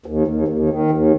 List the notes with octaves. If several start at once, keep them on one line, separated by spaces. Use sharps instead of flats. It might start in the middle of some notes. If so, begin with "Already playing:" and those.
D#2
D#2
D#2
D#3
D#2